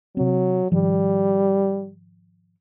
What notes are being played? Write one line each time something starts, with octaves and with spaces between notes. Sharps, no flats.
C3 F#3 C4
G#2 D#3 F3 G3